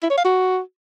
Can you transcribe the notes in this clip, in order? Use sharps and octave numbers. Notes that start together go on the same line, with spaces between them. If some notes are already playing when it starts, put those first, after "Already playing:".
E4
C#5
F5
F#4